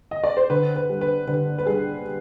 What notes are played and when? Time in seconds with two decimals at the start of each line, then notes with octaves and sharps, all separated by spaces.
0.11 D#5
0.24 D5
0.37 C5
0.50 D3 B4
0.76 B4
0.89 G3
1.01 B4
1.27 D3 B4
1.58 B4
1.66 G3 G#4